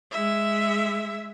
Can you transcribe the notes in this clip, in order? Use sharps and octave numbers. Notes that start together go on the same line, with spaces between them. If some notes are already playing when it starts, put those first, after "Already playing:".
G#3 E5